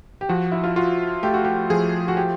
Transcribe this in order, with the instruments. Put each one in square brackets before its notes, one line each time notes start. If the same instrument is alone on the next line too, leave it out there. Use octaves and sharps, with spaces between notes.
[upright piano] G4
[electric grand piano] F3 [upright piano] F#4
[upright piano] E4
F4
[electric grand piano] F4 [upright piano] F#4
[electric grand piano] A3 [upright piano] G4
[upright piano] F#4
G4
[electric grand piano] F3 [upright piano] G#4
[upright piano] F#4
G4